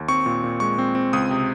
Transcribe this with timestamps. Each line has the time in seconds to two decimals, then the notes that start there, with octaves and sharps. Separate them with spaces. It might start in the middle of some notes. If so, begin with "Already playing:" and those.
Already playing: D#2
0.08 C4 C#6
0.26 A#2
0.44 A#2
0.60 G#3 C#6
0.78 C4
0.95 C4
1.13 C#2 D#6
1.30 C3